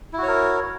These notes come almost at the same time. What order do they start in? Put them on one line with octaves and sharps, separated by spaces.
E4 F#4 C#5 A#4